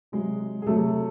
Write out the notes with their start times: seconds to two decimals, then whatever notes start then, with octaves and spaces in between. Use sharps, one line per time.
0.12 C3 F#3 G#3 G#4
0.62 G#4
0.66 C3 F#3 A3 A4